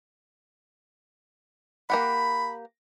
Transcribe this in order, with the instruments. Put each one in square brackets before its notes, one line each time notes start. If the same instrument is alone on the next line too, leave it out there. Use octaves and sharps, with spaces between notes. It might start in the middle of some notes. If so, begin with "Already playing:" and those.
[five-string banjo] A#3 G4 F#5 [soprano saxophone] B5